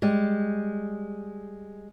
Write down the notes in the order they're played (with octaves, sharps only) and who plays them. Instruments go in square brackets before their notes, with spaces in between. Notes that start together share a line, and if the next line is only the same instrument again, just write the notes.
[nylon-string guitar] G3 G#3